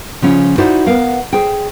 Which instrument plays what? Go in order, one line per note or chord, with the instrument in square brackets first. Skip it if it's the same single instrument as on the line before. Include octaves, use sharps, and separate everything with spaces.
[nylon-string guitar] C#3 F3 C#4
D#4 E4 F#4 C5 D5
B3 A#4 F5
G#4 C5 G5